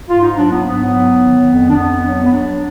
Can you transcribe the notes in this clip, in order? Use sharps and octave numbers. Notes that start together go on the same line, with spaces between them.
G#2 F4
D#4
F#3 D4
B3
G#2 B3
F#3
D#3
F2
D4
F2 B3
F#3
B3
F#3 D4